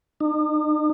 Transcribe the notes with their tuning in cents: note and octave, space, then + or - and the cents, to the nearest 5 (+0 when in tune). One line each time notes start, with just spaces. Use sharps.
D#4 -45